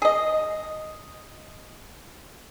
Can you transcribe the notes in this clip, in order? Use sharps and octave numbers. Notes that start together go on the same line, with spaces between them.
G#4 D#5